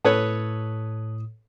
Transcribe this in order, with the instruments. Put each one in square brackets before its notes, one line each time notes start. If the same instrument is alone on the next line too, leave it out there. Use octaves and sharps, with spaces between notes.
[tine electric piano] A2 D#6 [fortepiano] A4 B4 C#5